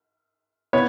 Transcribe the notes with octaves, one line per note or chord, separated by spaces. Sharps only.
B3 C#5